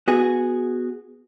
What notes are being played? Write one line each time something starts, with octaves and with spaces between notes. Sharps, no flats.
B3 F#4 G#4